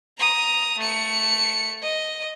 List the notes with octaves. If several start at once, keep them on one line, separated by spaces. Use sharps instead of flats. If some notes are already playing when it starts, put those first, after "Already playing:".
A#5 D#6
A3 C#7
D#5